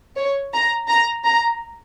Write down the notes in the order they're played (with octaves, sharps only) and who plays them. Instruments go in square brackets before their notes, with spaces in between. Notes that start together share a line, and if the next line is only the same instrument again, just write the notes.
[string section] C#5
A#5
A#5
A#5